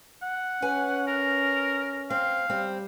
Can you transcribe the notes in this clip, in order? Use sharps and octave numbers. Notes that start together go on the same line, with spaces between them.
F#5
C#4 B4 G#5
A#4
C4 F5
G3 C4